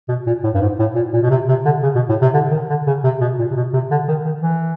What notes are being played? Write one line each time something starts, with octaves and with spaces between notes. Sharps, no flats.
B2
A#2
A2
G2
G#2
A2
A#2
A#2
B2
C3
C3
D3
C#3
B2
A2
C3
D3
D#3
D3
C#3
C3
B2
A#2
C3
B2
C3
D3
D#3
D#3
E3